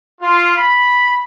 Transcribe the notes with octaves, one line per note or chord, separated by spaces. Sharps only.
F4
B5